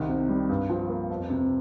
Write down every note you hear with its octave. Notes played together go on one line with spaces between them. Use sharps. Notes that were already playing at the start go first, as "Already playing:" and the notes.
Already playing: C2 D#3
C3
G3
G2
F3
A#3
F2
C3